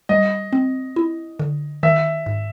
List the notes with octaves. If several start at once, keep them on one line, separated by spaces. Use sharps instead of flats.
G3 D#5
C4
E4
D3
D#3 E5
G#2